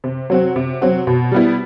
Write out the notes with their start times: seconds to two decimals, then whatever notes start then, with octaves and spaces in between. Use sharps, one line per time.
0.04 C3
0.30 F#3 C4 F#4
0.56 C3
0.82 F#3 C4 F#4
1.07 B2
1.32 G3 B3 E4